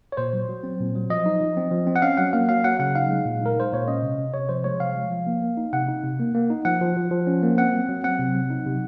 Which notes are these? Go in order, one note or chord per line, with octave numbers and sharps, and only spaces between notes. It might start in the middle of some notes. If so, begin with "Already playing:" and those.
C#5
A#2 C5
F#3
F#3
C4
A#2
F#3
F3 D#5
D#4
F3
C4
F3
C4
F#5
C#4 F5
F#3 F#5
A#3 F5
F#3 F5
F#3 F#5
C#3 F#5
D#4 F5
G#3
A#2
D#4 A#4
G#3 C5
A#2 C#5
C#4 D#5
C3
C3
C3 C#5
F3 C5
G#3 C#5
C3 F5
F3
F3
A#3
A#3
D#4
C3 F#5
D#4
C3
A#3
A#3
D#4
F3 F#5
F3
F3
F3
C#4
A#3
C4 F#5
F#3
F#3
C4 F#5
C3
F#3
D#4
C3